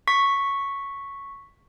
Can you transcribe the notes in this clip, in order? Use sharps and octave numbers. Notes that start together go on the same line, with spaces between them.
C#6 B6